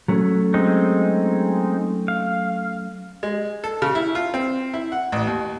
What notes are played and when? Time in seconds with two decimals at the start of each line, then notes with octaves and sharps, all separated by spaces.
0.08 F#3 A3 C#4
0.54 G#3 C4 D#4
2.08 F5
3.23 G#3
3.64 A4
3.82 C#3
3.95 E4
4.15 F4
4.34 C4
4.74 E4
4.92 F#5
5.12 A1
5.27 D#2